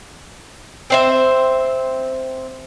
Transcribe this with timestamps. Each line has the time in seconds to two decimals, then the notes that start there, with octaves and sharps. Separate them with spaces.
0.90 C4 C5 E5